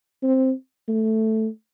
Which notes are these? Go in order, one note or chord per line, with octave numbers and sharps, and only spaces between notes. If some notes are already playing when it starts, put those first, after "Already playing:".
C4
A3